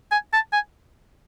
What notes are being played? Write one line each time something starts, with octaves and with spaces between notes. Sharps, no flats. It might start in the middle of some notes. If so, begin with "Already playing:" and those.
G#5
A5
G#5